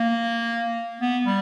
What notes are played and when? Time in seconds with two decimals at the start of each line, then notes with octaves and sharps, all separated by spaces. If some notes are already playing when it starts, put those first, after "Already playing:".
Already playing: A#3
1.01 B3
1.26 G3